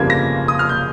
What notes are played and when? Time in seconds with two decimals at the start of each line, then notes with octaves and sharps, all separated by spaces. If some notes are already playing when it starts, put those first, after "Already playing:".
Already playing: G1 F2 C#3 G3 A#3 G#6
0.10 A#6
0.48 D#6
0.59 F6
0.69 G6